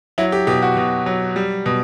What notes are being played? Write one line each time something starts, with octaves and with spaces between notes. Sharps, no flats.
F#3 E4
G4
B2 G4
F#4
B2
F#3
G3
B2